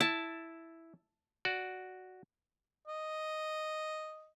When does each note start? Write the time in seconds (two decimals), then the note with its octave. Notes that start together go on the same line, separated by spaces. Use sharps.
0.01 E4 A5
1.45 F#4 D5
2.87 D#5